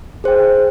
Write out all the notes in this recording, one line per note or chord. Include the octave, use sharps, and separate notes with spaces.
G#4 C5 G5